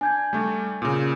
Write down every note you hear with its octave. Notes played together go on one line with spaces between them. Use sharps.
D4 G#5 G6 G#6
G3 A3 D4
A#2 C#3